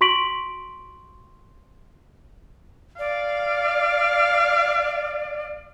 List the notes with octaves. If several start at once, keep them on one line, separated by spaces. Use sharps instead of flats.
F#4 C6 C#6 B6 D7 F#7
D5 F5